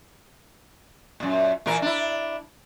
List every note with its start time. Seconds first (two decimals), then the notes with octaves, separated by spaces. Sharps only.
1.20 F#2 A#2
1.66 A#2 E3 A#4
1.82 D4 E4